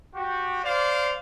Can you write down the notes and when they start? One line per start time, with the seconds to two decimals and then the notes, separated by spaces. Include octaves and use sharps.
0.15 F#4 G4
0.64 C5 D5 F5